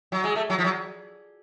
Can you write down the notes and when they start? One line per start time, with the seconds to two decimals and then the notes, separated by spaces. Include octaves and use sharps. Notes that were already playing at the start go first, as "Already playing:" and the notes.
0.12 F#3
0.24 G#3
0.35 A3
0.50 F#3
0.59 F3
0.64 F#3